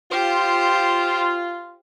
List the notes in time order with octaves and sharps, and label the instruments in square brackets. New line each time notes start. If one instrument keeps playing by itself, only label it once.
[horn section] F4 [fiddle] G4 C5